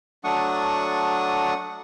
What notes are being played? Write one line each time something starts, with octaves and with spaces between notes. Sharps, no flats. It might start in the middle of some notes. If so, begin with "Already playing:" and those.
F#3 A3 D4 F#5 C#6 D#6